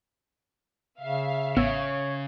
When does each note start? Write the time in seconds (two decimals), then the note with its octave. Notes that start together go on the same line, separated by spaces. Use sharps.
1.01 C#3 E5 F5
1.57 A1 C#3 B3 C#5 E6